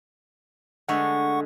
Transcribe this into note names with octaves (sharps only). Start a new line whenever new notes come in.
D3 G#3 A3 F#5 C#6